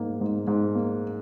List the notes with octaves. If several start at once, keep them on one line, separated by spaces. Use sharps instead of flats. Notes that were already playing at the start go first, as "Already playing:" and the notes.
Already playing: G#2 A#3
G#2
G#2
A#3